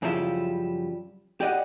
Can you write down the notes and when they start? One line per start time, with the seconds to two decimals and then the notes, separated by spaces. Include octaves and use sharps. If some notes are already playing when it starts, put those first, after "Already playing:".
0.02 F#2 C#3 F3 G3 E4 F4
1.40 G4 D5 D#5 F#5